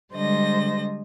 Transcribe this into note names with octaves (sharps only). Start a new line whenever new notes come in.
D3 G3 G#3 C5 D#5 A#6